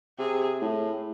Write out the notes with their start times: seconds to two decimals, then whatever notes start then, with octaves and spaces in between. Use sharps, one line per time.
0.19 C3 G#4
0.61 A2